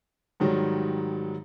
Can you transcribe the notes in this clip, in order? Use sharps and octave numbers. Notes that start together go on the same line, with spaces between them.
G#2 D#3 F#3 G3